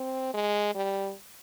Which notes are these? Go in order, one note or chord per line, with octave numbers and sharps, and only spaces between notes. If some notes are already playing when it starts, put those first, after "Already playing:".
Already playing: C4
G#3
G3